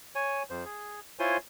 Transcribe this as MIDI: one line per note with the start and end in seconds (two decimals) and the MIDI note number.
0.15 0.43 73
0.15 0.43 80
0.50 0.64 41
0.50 0.64 72
0.66 1.00 68
1.19 1.37 64
1.19 1.37 65
1.19 1.37 72
1.19 1.37 73
1.19 1.37 80
1.19 1.37 84